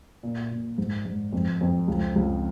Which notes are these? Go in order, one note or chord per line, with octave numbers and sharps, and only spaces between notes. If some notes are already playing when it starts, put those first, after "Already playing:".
A#2
A#2
G#2
G#2
F2
F2
C#2
C#2